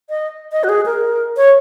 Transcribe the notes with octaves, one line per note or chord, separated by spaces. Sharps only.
D#5
D#5
F#4
G#4
A#4
C#5